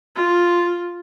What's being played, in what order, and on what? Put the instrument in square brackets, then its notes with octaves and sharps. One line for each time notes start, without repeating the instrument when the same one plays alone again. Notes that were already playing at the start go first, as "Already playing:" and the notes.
[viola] F4